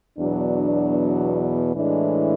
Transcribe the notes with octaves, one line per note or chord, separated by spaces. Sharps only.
E2 B2 F#3 D4
A2 E3 G#3 D4